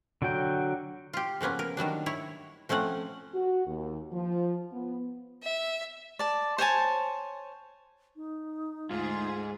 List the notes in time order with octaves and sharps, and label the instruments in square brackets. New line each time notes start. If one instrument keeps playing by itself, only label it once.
[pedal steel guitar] D3 F#3 F#4 G5
[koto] F4 G4
C#3 F3 A#3 B3 C#4
A#4
D#3 F#3 G3 D4
E4 C#5
F3 A3 C4 C#4 F#5
[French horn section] F#4
D#2
F3
B3
[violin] E5
[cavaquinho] D5 A5
C5 C#5 G#5 A5
[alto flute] D#4
[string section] D2 G#4 [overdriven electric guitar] G#2 [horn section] F4